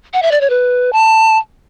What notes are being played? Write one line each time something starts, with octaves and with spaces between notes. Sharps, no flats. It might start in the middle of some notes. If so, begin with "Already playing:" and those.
F#5
E5
D5
C#5
B4
A5